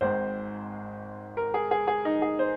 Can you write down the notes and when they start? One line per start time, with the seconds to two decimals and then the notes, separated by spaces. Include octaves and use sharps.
0.01 G#1 G#2 G#3 C4 C5
1.37 A#4
1.54 G#4
1.71 G#4
1.88 G#4
2.05 D#4
2.22 G#4
2.39 C5